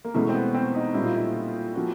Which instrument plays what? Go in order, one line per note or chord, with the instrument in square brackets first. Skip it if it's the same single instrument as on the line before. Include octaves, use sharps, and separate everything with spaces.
[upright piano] A#3
[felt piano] E2 B2 G#3 C#4 E4 [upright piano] A3
[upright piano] C4
B3
C4
D#4
[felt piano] A#2 G3 A#3 C#4 [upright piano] E4
[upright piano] F4
E4
[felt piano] F3 A#3 C#4 F#4